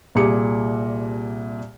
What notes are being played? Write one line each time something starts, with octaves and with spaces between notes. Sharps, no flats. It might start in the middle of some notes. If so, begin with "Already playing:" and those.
C2 A#2 G3 G#4 D6 C#7